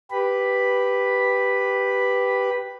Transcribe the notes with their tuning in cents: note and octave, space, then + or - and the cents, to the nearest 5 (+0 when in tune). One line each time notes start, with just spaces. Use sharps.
G4 +0 B4 +0 B5 +0